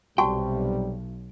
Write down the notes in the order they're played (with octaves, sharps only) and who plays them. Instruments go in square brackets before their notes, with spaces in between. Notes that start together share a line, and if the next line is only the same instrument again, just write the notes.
[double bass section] B1 [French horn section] C3 G3 [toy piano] F#4 A5 C#6 [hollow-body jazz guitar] G5